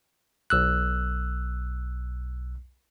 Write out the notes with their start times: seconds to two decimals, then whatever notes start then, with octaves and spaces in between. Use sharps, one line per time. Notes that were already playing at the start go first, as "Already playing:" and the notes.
0.50 B1 E6 F#6